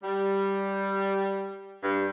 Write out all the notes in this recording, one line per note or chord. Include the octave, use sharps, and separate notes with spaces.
G3
G2